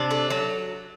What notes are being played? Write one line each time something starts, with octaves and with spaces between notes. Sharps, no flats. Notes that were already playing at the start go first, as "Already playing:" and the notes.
Already playing: C3 D4
A3
F#3